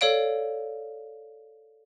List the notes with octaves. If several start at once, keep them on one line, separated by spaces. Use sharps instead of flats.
A4 C#5 D5 F5 D7